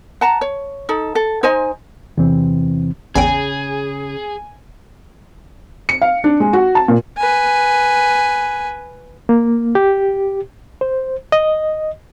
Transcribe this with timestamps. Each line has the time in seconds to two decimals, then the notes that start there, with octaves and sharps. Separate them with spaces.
0.21 F#5 A5 A#5
0.41 C#5
0.89 D#4 A4
1.15 A4
1.43 D#4 C5 D#5 G#5
2.18 E2 C3 E3 C4
3.15 A1 E2 C#3 G#4 G5 G#5
5.89 C#7
6.02 F5
6.24 D4
6.40 G#3
6.53 F#4
6.75 A5
6.88 A#2
7.18 B4 G#5
9.29 A#3
9.75 G4
10.81 C5
11.32 D#5